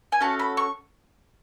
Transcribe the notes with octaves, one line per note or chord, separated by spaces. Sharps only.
G#5
A3 C#4 F#4 A4 A5
B5
C#6